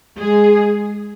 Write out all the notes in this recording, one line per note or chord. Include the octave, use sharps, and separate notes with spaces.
G#3 G#4